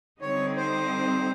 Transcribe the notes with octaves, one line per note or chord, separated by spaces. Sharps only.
D3 G3 C4 D#4 C#5
C5